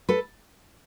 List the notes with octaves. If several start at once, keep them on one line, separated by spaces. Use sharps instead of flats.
A4 B4